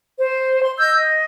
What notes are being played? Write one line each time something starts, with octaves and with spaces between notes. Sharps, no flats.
C5
C6
D#5 E6 G6
D#5